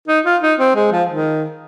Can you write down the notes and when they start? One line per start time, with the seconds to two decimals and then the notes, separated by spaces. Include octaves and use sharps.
0.08 D#4
0.25 F4
0.42 D#4
0.59 C4
0.75 G#3
0.92 F3
1.09 D#3